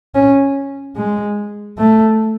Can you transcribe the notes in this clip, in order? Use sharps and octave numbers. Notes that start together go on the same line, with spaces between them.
C#4
G#3
A3